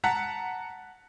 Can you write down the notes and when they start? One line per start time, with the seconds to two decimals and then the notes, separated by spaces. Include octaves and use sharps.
0.04 F#5 A5 A#5 F#6 B6